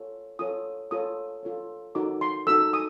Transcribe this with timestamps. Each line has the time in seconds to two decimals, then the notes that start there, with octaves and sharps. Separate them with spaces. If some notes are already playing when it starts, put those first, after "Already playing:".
Already playing: F4 A4 C#5
0.39 F4 A4 C#5 D#6
0.91 F4 A4 C#5 D#6
1.43 F4 A4 C#5
1.95 D#4 F#4 A4 D6
2.21 C6
2.47 D#4 F#4 A4 E6
2.73 D#6